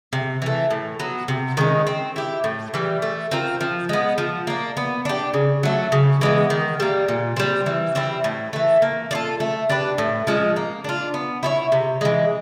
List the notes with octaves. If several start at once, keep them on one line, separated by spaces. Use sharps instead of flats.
C3
E3 A3
A2
F#3 B3
C3
D#3 G#3 C#4
C4
E4 G4
A2
E3 G3
A3
C4 F4 A#4
F3
G#3 B3
F3
A#3 D4
B3
D4 G4
C#3
F#3 A3
C#3
E3 G#3 B3
D#3
G3 A#3
A#2
G3 C4
E3
G3 C4 E4
A2
E3 A3
A#3
D4 F4 A4
A3
D4 G4 B4
A2
F3 G#3 C#4
A#3
D4 F4
B3
E4 G#4 C#5
C3
E3 G#3